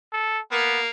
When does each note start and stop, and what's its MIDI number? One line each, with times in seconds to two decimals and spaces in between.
0.13 0.40 69
0.52 0.89 58
0.52 0.81 59